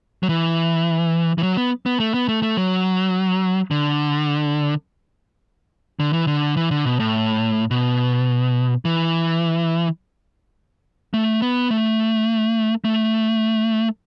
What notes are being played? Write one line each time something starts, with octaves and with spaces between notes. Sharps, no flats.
F#3
E3
E3
F#3
B3
B3
A3
B3
A3
A3
F#3
D3
D3
E3
D3
E3
D3
B2
A2
B2
E3
A3
B3
A3
A3